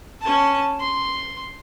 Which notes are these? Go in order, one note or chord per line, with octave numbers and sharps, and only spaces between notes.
C#4 A5
C6